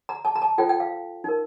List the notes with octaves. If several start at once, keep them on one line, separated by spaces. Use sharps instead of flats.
A#5
A5
A#5
A5
F4 A4 C5 G5
G5
F5
D#4 A#4